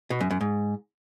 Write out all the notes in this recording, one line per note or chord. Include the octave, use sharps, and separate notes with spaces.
B2
F#2
F#2
G#2